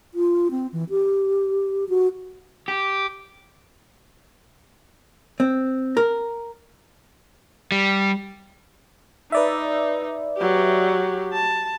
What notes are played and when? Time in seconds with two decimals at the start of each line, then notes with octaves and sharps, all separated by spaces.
0.14 F4
0.51 C4
0.72 E3
0.90 G4
1.89 F#4
2.68 G4
5.40 C4
5.97 A#4
7.72 G3
9.32 D#4 B4 D5 E5
10.38 F#3 G4
11.33 A5